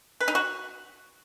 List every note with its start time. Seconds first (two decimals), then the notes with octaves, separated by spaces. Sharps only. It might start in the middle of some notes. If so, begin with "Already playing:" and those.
0.21 B4
0.28 D#4
0.35 F#4